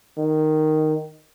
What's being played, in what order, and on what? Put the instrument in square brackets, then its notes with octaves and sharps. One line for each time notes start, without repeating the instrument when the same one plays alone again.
[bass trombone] D#3